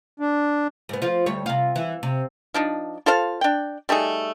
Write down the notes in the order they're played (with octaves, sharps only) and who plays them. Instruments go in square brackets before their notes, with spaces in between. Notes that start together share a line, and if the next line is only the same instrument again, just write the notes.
[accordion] D4
[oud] G#2 B3
F3 F4
D2 G3 C#5
C3 F4
E3
C3
[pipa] F3 D4 D#4
F4 A4 C5 F5
D4 G5
G3 A3 D#4 G#4